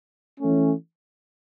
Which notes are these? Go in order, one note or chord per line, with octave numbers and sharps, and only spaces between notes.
E3 A3 C#4